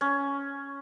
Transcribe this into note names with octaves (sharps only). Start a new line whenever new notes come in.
C#4